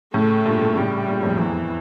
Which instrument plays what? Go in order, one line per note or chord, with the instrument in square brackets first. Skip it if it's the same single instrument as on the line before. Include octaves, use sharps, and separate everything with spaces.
[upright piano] A2 C#3 [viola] A3
[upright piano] G2 A#2
G2 A#2
[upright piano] A2 C#3 [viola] G3
[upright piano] G2 A#2
F2 A2
[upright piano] E2 [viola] E3
[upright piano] F2